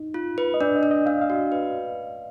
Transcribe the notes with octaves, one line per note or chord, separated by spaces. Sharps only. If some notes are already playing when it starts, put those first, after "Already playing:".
Already playing: D#4
F4
B4
D#5
D4 D5
D#5
D4
D#5
D4 F5
F5
F#4
B4